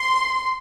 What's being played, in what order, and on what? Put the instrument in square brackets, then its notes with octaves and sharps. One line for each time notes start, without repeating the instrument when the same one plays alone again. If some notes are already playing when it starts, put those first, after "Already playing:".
Already playing: [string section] C6